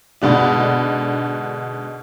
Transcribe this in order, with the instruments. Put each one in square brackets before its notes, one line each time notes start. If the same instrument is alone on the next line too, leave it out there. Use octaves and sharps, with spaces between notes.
[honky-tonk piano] G#2 B2 D3 D4